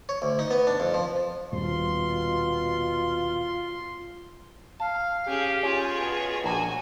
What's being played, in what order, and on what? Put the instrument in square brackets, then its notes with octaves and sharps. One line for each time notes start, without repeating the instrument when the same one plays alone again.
[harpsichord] C#5
D2
D#4
B3
D4
F2
F3
[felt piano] D#1 [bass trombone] B2 [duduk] F4 [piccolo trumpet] C6
[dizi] F5 [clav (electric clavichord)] A5
[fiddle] C#4 G#4 [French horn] G4
[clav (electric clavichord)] C#4 [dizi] F4 [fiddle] G#4 C#5
[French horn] B2
[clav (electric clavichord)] A#1 A5 [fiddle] F#4 G#5